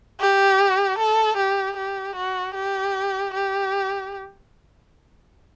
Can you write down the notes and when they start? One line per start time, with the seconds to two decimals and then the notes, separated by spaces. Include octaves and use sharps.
0.21 G4
0.99 A4
1.37 G4
1.77 G4
2.16 F#4
2.55 G4
3.34 G4